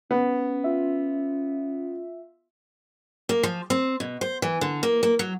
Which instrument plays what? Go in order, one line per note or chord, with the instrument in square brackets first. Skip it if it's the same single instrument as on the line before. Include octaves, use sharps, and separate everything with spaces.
[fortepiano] B3 [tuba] C#4
[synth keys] F4 E5
[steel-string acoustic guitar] A#3
F3
C4
B2
C5
E3
D3
A#3
A#3
F#3